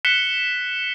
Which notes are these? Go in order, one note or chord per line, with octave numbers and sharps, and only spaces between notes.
F#6 B6 C#7 E7 G7